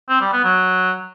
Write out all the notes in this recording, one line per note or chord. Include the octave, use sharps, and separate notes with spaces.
C4
G3
B3
F#3